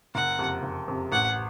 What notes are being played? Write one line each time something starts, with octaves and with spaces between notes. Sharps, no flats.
F#1 F#5
F2 C3
F#1
F2 C3
A1 F#5